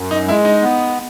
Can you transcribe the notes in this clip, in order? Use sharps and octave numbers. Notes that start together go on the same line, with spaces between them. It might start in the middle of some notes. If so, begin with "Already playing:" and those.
Already playing: F#2
D#4
G#3 E4
D#4
B3